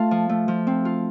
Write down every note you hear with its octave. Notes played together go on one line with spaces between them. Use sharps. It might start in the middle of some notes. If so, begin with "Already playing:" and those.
Already playing: A3 F4 F5 A5
F3
A3
F3
C4
F4